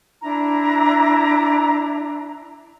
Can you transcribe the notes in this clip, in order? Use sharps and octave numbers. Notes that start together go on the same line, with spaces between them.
D4 E4 A#5